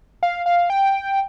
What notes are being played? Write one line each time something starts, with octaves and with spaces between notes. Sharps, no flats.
F5
F5
G5